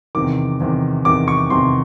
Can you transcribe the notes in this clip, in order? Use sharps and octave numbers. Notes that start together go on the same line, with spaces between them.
E2 C3 D#3 D6
E2 C3 D#3
E2 C3 D#3 D6
C#6
E2 C3 D#3 C6